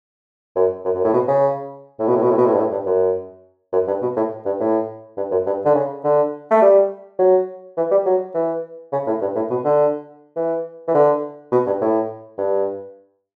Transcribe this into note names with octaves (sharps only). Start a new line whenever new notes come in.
F#2
F#2
F#2
A2
B2
C#3
A2
B2
A2
B2
A2
B2
A2
G2
A2
G2
F#2
F#2
G2
B2
A2
G2
A2
G2
F#2
G2
D3
C#3
D3
A3
G3
F#3
E3
G3
F#3
E3
C#3
A2
G2
A2
B2
D3
E3
E3
D3
B2
G2
A2
G2